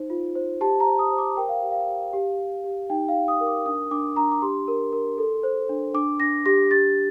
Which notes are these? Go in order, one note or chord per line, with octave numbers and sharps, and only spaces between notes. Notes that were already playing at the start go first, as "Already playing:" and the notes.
Already playing: D#4 C5
F4
C5
G4 A5
A#5
C5
D#6
C5
D6
A#4 G5
F5
G4
F5
G4
G4
G4
G4
D#4 G5
F5
D#4
D#6
A#4
D6
D4 D#6
D4 D6
D4 A#5
D6
G4 C6
A#4
A#4
A4
C5
D4
D4 D6
D4 A#6
G4 A#6
G4 A6